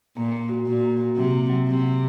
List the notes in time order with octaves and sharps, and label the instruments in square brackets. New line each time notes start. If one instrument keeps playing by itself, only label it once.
[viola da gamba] A#2 [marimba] A#3
[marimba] A#3
F#4
[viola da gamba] A#2 [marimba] F#4
[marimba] A#3
F#4
[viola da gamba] C3 [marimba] F#3
[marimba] A#3
F#3
[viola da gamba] C3 [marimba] F#3
[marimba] F#3